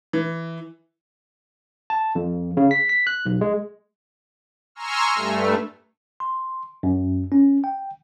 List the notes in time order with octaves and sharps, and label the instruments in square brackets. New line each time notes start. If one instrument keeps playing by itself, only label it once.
[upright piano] E3
[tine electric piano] A5
F2
C#3
B6
B6
F#6
B1
G#3
[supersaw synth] G#5 A#5 C6 C#6 E6 F6
G2 A3
[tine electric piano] C6
F#2
C#4
G5